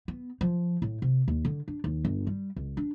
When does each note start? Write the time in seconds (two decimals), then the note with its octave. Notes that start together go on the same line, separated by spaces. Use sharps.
0.08 B3
0.41 F3
0.82 A2
1.02 C3
1.28 D#2
1.45 D3
1.68 D4
1.84 D#2
2.05 G1
2.27 G3
2.56 C#2
2.77 D4